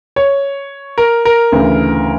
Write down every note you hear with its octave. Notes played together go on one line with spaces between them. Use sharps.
C#5
A#4
A#4
D2 C#3 E3